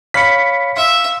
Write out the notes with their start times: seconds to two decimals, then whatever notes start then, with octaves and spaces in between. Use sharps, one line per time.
0.14 C#5 F5 B5 B6 C#7
0.76 E5 F5 C6